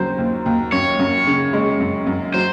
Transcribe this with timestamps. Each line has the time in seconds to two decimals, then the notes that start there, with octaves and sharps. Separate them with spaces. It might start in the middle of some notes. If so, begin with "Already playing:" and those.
Already playing: D#2 C#3 F#3 C5
0.18 D#2
0.46 D#2
0.72 F#2 C#5
0.99 F#2
1.26 C#3
1.53 G#3
1.80 F#2
2.07 F#2
2.34 F#3 C5